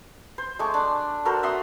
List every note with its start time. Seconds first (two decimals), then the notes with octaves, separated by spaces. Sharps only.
0.38 C5
0.59 G#3 A3 C#6 D6
0.74 D4
1.25 F#4 A4 A#4 C5
1.43 E5 F#5 C6 D#6